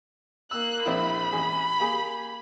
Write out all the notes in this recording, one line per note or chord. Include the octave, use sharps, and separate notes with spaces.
A#3 E6 F#6
A#1 C4 E4 B5
A1 G#4
A#3 G4 G#4